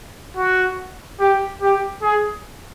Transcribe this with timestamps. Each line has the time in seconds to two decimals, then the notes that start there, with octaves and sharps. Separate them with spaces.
0.37 F#4
1.20 G4
1.61 G4
2.02 G#4